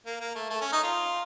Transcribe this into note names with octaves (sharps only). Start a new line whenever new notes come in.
A#3
A#3
A3
A3
C#4
D#4
F4